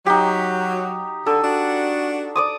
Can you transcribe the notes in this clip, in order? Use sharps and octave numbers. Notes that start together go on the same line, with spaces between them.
F#3 D#4 G4
D3 A4
D4 F#4
D5 D6 D#6